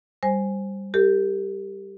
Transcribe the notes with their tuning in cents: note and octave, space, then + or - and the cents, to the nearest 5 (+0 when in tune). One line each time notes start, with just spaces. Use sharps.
G3 +5 C5 +5 G#5 +0
G4 +0 A#4 -45